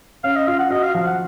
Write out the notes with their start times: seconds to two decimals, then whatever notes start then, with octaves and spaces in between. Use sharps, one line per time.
0.24 C#4 F5
0.36 D#5
0.47 F4 F5
0.59 F#5
0.70 F#4 D#5
0.83 F5
0.95 F3 F5
1.06 F#5